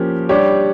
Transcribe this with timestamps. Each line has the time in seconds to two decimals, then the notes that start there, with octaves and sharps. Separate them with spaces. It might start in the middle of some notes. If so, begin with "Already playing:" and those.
Already playing: F3 A#3 C#4 G4
0.29 G3 D4 G4 C#5